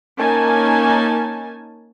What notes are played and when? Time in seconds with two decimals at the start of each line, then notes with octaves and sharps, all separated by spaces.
0.18 A#3 C#4 D#4 G#5 A5